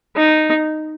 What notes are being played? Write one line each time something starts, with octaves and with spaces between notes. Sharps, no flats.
D#4